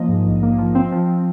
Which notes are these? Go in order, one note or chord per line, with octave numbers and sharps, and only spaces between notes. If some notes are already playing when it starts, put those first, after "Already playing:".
Already playing: F3 A#3 D#5
G#2
A#1
A#3
F3
C4
F3